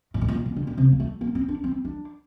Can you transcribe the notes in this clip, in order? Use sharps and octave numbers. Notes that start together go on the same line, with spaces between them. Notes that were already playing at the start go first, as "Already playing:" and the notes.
A2
A#2
A2
A#2
A#2
D3
A#2
C3
A#3
A3
A#3
C4
D4
C4
D4